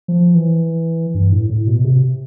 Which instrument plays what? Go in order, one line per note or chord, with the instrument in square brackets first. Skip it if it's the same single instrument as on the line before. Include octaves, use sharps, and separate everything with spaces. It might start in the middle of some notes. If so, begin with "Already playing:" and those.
[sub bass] F3
E3
G2
A2
A2
B2
B2
C3